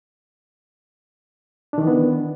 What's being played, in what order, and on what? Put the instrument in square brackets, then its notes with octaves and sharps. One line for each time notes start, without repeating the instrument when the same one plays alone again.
[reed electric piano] D4
D#3
E3
B3